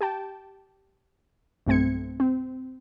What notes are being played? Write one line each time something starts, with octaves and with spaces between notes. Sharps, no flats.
G4 G5 A5
B1 G2 A3 C4 G#6 C#7
C4